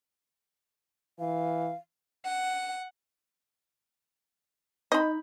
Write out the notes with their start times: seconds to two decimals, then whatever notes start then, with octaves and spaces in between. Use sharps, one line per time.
1.19 E3 F5
2.24 F#5
4.92 D#4 D#5 B5